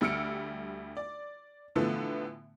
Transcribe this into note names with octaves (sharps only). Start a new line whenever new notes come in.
D2 G3 E6 F6 C#7 D7
D5
A2 D3 E3 F3 A3 B3